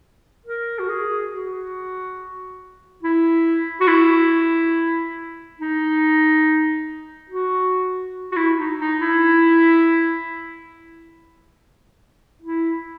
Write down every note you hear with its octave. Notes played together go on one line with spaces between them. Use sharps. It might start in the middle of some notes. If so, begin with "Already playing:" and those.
A#4
F#4
G#4
F#4
E4
F#4
E4
D#4
F#4
F#4
E4
D#4
D#4
E4
E4